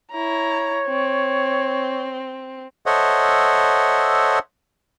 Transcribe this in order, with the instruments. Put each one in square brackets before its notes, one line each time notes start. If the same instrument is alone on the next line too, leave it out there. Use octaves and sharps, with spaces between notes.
[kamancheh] E4 A#5 [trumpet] C#5
[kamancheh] C4
[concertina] A4 C5 C#5 D#5 E5 F#5